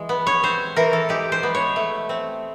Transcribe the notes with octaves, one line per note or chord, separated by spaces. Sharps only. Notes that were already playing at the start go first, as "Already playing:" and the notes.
Already playing: E3 G#3
B3
C#5
C4 C5
E3 A#4
A4
G#3 G4
C5
B3
C#5
A3
C4